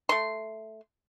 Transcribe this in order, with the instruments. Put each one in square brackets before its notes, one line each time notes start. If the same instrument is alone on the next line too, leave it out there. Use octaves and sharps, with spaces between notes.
[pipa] A3 C6